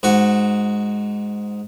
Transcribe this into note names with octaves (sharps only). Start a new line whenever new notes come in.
G#2 F#4